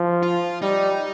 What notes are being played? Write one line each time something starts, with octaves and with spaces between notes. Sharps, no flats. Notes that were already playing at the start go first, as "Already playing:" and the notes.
Already playing: F3
F4
G3 D#4